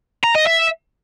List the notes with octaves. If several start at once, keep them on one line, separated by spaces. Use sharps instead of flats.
A#5
D#5
E5